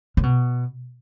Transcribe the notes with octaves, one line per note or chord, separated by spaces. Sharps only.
C#3
B2